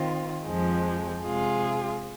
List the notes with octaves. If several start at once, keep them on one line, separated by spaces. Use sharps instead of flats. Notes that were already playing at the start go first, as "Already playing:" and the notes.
Already playing: D#3 C4 F4
F2 F3 G#3
C3 G#3 F4 G#4